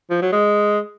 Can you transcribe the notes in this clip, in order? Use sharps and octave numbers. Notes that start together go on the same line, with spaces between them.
F3
F#3
G#3